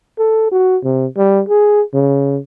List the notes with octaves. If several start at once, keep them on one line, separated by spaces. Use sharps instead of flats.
A4
F#4
C3
G3
G#4
C#3